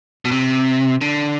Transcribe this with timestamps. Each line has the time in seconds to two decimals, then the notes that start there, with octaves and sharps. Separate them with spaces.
0.25 B2
0.31 C3
1.01 D3